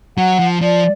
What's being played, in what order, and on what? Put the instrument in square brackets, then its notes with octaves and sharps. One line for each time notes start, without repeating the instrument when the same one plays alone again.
[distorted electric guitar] F#3 [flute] F#5
[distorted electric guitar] F3
[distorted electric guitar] F3 [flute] D5